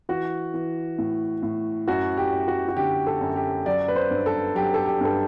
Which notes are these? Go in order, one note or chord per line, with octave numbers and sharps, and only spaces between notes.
E3 F#4
E3
A2
A2
F#2 F#4
G4
F#2
F#4
F#4
D3 G4
A4
F#2
G4
F#3 D5
B4
C5
G2
A4
F#3 G4
A4
G4
G2 A4